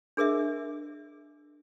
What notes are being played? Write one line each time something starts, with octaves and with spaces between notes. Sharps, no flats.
D4 G#4 A#4 D#5 E5